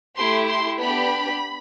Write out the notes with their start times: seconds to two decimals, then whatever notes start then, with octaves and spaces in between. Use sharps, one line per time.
0.17 A3 E4 G4 C6
0.48 C6
0.79 B3 D4 G4 B5